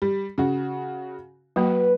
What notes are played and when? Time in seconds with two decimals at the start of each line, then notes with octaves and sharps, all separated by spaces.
0.02 G3
0.38 C#3 F#4
1.56 F#3 A#3 F#4 B4